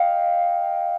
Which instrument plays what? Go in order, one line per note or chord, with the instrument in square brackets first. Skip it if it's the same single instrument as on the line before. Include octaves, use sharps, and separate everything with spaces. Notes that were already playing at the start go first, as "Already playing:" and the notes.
Already playing: [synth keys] D#5 F5 G5